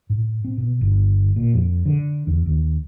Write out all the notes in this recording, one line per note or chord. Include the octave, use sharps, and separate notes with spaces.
A2
C4
B2
G1
A#2
F2
D3
E2
D#2